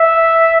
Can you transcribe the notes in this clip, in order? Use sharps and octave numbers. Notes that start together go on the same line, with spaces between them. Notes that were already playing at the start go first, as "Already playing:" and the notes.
Already playing: E5